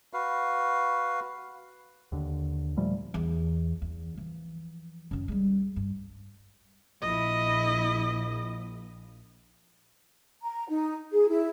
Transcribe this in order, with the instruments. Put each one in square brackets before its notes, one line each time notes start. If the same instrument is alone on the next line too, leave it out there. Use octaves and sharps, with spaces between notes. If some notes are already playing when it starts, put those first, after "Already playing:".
[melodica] F#4 B4 F5
[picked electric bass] D#2 D3
A#2 F3 G3 A3
[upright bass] E2
E2
E3 F3
F#2 D#3
G3 G#3
G2
[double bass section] A#1 [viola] E4 D#5
[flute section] A#5
D#4
G#4
E4